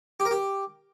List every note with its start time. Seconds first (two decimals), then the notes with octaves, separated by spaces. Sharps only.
0.20 G4
0.25 A#4
0.31 G4